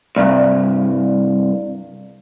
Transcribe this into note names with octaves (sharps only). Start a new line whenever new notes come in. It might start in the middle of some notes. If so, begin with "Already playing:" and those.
C2 G2